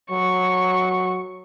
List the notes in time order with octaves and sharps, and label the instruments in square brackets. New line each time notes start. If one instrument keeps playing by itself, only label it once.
[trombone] F#3 [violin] C#6